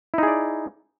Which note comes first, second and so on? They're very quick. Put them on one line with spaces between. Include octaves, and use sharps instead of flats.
E4 D#4 G#4 D5